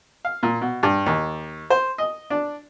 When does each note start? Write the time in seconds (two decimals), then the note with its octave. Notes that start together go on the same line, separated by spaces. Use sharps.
0.25 F5
0.43 A#2
0.61 B2
0.83 G2
1.06 D#2
1.70 C5
1.98 D#5
2.30 D4